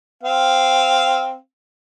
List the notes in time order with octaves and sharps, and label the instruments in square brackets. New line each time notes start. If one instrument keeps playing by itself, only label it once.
[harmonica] C4 F5